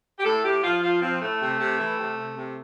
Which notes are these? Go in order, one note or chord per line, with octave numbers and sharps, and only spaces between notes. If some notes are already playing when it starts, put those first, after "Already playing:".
G4
A2 A4
A2 G4
F3 F4
F3 F4
F3 C4
A2 A3
C3
C3
E3
C3
C3
C3